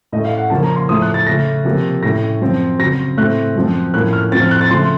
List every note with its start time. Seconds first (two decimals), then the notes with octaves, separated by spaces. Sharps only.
0.12 A2 A3 C#4 D#5
0.25 F5
0.38 F#5
0.50 C#3 F3 A#3 C#4 A5
0.64 A#5
0.76 C6
0.89 A2 F3 A3 D#6
1.02 F#6
1.14 A6
1.26 C#3 A3 C#4 A#6
1.65 C3 F3 A#3
2.03 A2 A3 C#4 A#6
2.41 F#2 F3 C4
2.79 C#3 F#3 C4 A#6
3.17 A2 A3 C4 F#6
3.56 F#2 F3 C4
3.94 A2 F3 A#3 C#4 F#6
4.13 F6
4.32 A2 F3 C4 A6
4.42 F6
4.51 F#6
4.61 A6
4.70 C#3 F3 A3 C#4 C6